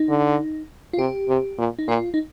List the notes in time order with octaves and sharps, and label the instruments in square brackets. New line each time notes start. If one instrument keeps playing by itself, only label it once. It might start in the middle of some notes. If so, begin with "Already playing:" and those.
Already playing: [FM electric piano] D#4
[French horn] D3
[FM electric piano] F4
[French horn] C3 [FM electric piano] G4
[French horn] C3
A#2
[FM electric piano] D#4
[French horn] A#2 [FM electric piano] F4
[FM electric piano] D#4